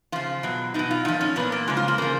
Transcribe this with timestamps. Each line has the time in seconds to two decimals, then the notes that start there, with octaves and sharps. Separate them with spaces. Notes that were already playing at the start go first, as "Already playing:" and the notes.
0.12 C#3 F3 F4
0.43 B2 F#3
0.74 B2 F#3 D#4
0.91 F4
1.05 A#2 F3 D#4
1.21 C#4
1.36 A#2 F3 B3
1.52 A#3
1.68 C#3 F3 G#3
1.77 F4
1.88 A#3
1.98 C#3 F3 A#3